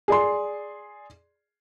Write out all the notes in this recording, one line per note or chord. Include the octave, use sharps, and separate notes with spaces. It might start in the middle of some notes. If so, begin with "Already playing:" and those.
G#4 D5 C6